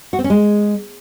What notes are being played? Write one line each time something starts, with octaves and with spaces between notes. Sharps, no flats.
F#4
C4
C#4
G#3